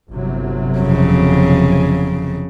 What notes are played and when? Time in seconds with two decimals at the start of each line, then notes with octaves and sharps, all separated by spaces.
0.10 G1 C3 F#3
0.78 F2 C#3